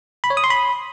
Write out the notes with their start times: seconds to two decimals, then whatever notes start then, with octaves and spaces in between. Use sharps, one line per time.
0.24 B5
0.30 C#5
0.37 D#6
0.44 C6
0.50 B5